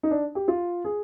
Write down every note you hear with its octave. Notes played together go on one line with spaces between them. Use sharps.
D#4
D4
G4
F4
G#4